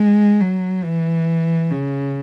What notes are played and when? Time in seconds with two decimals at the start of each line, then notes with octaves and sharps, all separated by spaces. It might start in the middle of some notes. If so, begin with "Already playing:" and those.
Already playing: G#3
0.41 F#3
0.84 E3
1.72 C#3